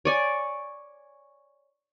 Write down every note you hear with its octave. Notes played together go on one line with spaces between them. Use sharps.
C#5 D5 G#5